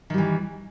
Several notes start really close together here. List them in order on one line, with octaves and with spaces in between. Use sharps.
D#3 G3 E3